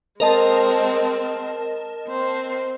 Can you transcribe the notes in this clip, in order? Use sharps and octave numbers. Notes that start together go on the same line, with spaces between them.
G#3 C4 A#4 D#5 A5
C4 C5